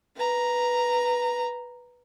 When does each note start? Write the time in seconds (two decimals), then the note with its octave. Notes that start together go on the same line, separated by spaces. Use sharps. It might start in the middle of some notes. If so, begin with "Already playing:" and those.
0.16 B4 A#5